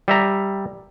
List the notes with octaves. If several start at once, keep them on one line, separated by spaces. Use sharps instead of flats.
G3 E5 A#5